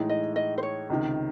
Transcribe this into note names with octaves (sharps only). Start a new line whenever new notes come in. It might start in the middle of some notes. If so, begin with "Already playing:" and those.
Already playing: A2 E3 G#3 D#4
D#5
D#5
C5
C#5
C#2 C3 D#3